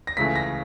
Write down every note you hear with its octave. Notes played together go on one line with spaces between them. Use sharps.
A#6
C#2 C#3 E3 A3 B6
A#6